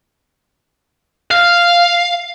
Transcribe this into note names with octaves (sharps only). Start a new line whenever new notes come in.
F5